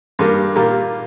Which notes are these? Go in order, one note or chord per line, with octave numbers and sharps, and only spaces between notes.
G2 G3 A#3
A#2 G3 A#3